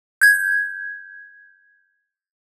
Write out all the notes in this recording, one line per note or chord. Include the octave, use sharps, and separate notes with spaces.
G6 G#6